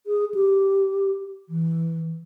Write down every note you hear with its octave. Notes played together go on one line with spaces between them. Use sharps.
G#4
G4
E3